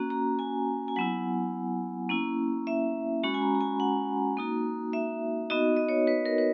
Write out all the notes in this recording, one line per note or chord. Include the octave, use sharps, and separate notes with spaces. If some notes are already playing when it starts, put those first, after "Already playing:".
Already playing: A#3 C#4 F#4
A#5
G#5
G#5
F#3 B3 E4 F#5
A#3 C#4 E4
E5
G#3 C#4 F#4 B5
G#5
A#5
A#5
G#5
F#5
A#3 D#4 F#4
E5
B3 D#4 F#4 D#5
D#5
C#5
B4
A#4
B4